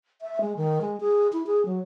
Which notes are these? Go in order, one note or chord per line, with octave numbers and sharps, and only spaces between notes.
E5
G#3
D#3
G#3
G#4
E4
G#4
F#3